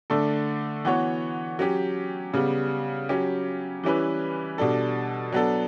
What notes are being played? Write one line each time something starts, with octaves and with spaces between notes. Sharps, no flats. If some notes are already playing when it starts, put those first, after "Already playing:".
D3 A3 D4 A4
E3 B3 F#4 C#5
F#3 C#4 G4
C#3 G3 B3
F#3 C#4 G4
E3 G3 C#4 E4 B4
B2 G3 D4 A4
F#3 B3 D4 A4